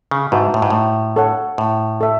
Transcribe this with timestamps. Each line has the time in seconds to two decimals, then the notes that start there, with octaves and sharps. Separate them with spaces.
0.11 C#3
0.32 G#2 F#4 B4 E5 A5
0.54 A2
0.62 G#2
0.70 A2
1.16 A4 C#5 F#5
1.58 A2
2.01 A4 E5